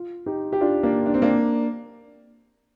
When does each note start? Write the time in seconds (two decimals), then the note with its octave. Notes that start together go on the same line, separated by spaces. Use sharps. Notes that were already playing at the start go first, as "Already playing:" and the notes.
Already playing: F4
0.26 D#4 G4
0.52 G4
0.61 D4 F4
0.83 A#3 D4
1.06 D4
1.14 C4
1.22 A#3 D4